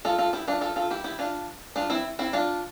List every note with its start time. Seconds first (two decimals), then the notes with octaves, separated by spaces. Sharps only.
0.05 F4 A4
0.18 F4 A4
0.33 E4 G4
0.47 D4 F4
0.61 F4 A4
0.76 F4 A4
0.90 E4 G4
1.04 E4 G4
1.19 D4 F4
1.76 D4 F4
1.90 C4 E4
2.19 C4 E4
2.33 D4 F4